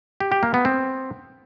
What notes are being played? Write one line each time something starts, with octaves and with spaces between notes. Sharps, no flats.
G4
G4
A#3
B3
C4